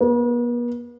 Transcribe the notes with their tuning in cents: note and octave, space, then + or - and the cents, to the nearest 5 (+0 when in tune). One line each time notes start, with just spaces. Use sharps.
B3 -45